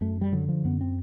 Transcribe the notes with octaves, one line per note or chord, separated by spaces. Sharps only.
F#2 A3
G3
D3 F#3
F3
F#2 B3
C4